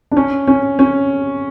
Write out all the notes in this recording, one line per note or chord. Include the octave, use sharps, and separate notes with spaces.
D4
C#4
C#4
C#4